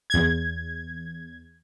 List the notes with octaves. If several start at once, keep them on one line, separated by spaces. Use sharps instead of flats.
E2 G#6